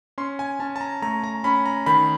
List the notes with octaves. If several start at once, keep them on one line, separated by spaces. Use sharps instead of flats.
C#4 C6
G#5
C#4 A5
A5
A#5
A3 A#5
A#5
C#4 B5
A#5
D#3 B5